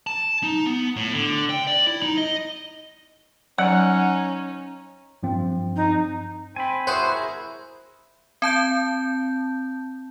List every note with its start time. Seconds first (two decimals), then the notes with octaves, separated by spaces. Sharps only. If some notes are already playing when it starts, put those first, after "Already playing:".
0.07 A5
0.43 D#4
0.67 B3
0.96 A2
1.13 D3
1.50 G5
1.67 D5
1.87 E4
2.02 D#4
2.18 D#5
3.58 F#3 C#4 D#4 D5 F#5
5.23 G2 F3 C4
5.76 D#4
6.56 C4 G#5 B5
6.87 E4 F#4 G#4 C5 F#5
7.12 G#4 A#4
8.42 C4 A5 G6